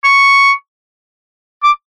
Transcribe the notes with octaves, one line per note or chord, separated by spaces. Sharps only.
C#6
D6